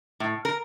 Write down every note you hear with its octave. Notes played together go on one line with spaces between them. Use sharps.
A2
A#4